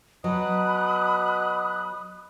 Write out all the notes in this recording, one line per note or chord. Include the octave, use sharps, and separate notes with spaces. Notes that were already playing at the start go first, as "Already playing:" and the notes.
B2 F#3 B5 D#6 F#6